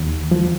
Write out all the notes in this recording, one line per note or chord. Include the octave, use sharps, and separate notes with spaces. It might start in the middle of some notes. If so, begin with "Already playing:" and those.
Already playing: D#2
F3